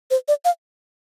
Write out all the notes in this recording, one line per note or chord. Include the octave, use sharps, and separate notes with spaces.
C5
D5
F5